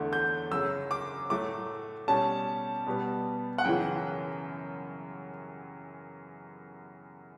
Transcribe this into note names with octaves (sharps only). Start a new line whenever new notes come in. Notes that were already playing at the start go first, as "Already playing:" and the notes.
Already playing: E2 D3 A3
G6
F#2 C#3 F#3 E6
D6
A2 F#3 A3 D6
B2 G3 C#4 A5
B2 G3 B3
F#5
F#2 C#3 E3 G5